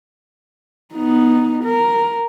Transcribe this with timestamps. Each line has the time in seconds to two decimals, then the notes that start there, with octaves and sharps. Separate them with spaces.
0.94 B3 D#4
1.64 A#4